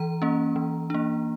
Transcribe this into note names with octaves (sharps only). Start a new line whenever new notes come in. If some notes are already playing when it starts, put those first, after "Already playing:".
Already playing: E3 A#5
A#3 C#4
E3
A#3 D4